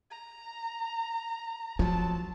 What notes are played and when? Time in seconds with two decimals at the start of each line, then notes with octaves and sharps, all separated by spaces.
0.10 A#5
1.79 F3 F#3 F4 A5